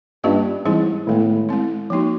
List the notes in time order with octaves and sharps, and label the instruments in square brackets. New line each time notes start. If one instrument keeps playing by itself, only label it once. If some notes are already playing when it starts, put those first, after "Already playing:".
[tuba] G2 [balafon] G3 A#3 C#4 F4
[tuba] G#2 [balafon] E3 G3 C4 E4 G#4
[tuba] A2 [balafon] D#3 G#3 B3
[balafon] G#3 C4 E4
F3 A#3 D#4 F#4